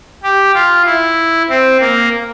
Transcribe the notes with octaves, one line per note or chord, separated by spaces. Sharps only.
G4
F4
E4
C4
A#3